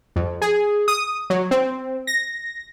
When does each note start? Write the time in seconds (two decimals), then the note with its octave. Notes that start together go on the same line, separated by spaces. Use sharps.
0.16 F2
0.42 G#4
0.88 D#6
1.30 F#3
1.51 C4
2.07 A#6